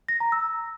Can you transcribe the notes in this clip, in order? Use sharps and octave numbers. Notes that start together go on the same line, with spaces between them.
A#6
A#5
E6